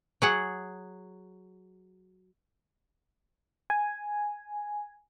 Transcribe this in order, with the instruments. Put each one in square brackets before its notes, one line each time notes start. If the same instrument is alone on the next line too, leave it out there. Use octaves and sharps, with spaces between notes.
[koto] F#3 G#4 F#5
[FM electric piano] G#5